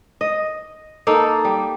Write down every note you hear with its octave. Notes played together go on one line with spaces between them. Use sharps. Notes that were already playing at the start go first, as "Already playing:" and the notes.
D#5
A#3 D#4 A4
G3